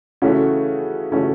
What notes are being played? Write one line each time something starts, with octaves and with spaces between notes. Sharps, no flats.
C#3 E3 A3 C#4 F#4
C#3 E3 A3 C#4 F#4